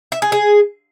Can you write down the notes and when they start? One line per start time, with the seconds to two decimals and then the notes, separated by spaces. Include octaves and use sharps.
0.12 E5
0.22 G#4
0.32 G#4